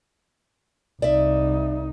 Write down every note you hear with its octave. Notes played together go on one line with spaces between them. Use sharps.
C2 D#4 D5 E5